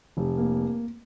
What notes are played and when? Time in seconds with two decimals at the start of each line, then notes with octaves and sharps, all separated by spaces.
0.17 F1
0.38 A#3